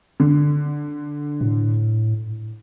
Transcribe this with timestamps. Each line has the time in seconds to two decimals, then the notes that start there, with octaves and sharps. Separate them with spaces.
0.20 D3
1.41 A2